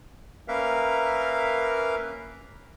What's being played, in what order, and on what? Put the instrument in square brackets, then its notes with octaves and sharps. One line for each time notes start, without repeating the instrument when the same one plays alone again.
[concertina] A#3 C#4 A#4 B4 E5 F5